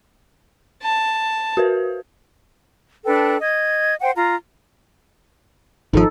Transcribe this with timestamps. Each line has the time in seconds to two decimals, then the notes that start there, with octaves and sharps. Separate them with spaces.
0.83 A5
1.57 F#4 A#4 B4
3.06 D4 A4 B4 G5
3.40 D#5 G#6
4.02 C5 F#5 G5
4.15 F4 A#5
5.93 G#1 F3 D#4 A4